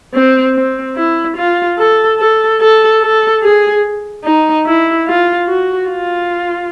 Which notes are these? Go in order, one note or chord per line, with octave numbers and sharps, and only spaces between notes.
C4
C4
E4
F4
A4
A4
A4
A4
G#4
D#4
E4
F4
F#4
F4